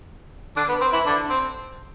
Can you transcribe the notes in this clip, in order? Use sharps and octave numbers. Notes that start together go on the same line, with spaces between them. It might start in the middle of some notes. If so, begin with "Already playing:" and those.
D3 D4
B3
C4
E3 E4
D3 D4
C4